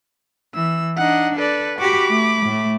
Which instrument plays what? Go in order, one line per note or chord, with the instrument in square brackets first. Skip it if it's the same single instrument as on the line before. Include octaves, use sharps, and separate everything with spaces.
[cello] E3 [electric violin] E6
[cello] D4 D#4 [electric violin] D#5 F#5
[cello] A4 [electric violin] B4 D5
[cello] F#4 G4 [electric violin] B5 D6
[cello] A3
A2 A3